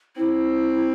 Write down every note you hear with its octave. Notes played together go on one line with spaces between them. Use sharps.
C4 E4